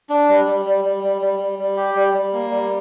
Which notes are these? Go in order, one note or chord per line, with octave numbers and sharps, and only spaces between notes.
D4
G3
G3
G3
G3
G3
G3
G3
G3
G4
G3
G3
A#3
G3